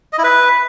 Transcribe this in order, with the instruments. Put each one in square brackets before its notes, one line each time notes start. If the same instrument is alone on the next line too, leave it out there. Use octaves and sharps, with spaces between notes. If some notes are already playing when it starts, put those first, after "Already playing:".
[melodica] D#5
E4
B4